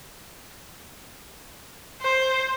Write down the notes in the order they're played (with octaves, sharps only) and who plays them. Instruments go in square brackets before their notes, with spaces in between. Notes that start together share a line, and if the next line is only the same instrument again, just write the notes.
[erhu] C5